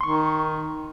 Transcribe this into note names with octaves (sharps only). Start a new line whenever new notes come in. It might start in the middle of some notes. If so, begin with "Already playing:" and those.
D#3 C6 C#6